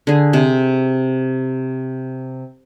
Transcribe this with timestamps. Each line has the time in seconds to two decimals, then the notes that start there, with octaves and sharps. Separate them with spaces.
0.07 D3 G#4
0.33 C3